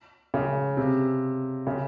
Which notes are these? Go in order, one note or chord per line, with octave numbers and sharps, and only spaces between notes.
C#3
C3
C#3